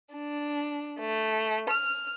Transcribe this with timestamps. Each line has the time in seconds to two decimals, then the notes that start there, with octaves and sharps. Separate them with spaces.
0.13 D4
1.00 A3
1.70 F6